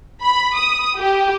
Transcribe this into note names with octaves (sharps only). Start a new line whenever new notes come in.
B5
D#6
G4